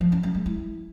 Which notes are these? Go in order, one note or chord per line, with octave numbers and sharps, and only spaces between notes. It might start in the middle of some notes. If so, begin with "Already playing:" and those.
F3
C#4
F#3
G#3
E4